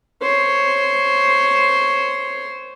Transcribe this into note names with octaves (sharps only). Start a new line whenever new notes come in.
C5 C#5